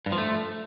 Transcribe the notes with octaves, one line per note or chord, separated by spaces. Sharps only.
G2
F3
A3